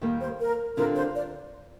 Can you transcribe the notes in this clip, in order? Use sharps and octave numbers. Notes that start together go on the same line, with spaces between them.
D#2 D#3 G3 A#3
C5
A#4
D3 G3 C4 F4 A#4
C5
D5